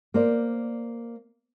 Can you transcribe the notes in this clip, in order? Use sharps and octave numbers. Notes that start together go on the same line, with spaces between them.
A#3 C5 D5